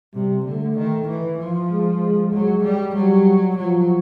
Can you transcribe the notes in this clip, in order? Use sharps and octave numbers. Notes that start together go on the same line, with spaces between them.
C3 G3
D3 A3
D#3
E3
F3
G#3
G#3
F#3 G#3
G3
F#3 G3
F3 F#3